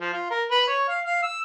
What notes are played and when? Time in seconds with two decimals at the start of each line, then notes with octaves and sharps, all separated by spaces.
0.01 F3
0.13 F4
0.30 A#4
0.51 B4
0.67 C#5
0.89 F5
1.05 F5
1.23 E6